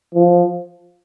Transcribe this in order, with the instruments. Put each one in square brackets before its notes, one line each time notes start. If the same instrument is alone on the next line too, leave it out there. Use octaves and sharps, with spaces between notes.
[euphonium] F3